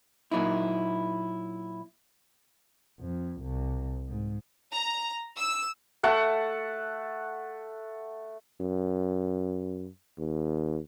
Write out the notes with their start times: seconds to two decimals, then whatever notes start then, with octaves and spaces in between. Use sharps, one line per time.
0.32 A#2 F#3 A#3 D#4 E4
3.00 F2
3.41 C2
4.08 G#2
4.72 A#5
5.37 E6
6.03 A3 F#5 A5
8.60 F#2
10.18 D#2